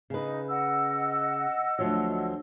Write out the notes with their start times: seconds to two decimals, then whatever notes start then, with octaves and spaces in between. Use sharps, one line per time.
0.10 C#3 D#4 B4
0.49 D#5 F#5 E6
1.79 D2 F3 F#3